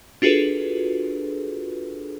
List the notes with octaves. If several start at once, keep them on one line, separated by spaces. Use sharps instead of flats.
D4 F4 F#4 G#4 A4 B4